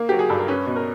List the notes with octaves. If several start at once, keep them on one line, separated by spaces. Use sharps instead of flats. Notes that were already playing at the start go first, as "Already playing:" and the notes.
Already playing: A#3
F#3 G4
G#4
G2 A4
A#4
C#4 B4
B2
A#4